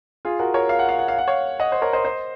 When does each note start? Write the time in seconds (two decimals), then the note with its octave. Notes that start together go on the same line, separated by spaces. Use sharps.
0.25 F4 G#4
0.39 F#4 A#4
0.54 A#4 C#5
0.69 F5
0.79 F#5
0.89 F5
0.99 F#5
1.08 F5
1.18 F#5
1.28 C#5 F5
1.59 D#5 F#5
1.72 C5
1.82 A#4 C#5
1.93 C5 D#5
2.04 C5 D#5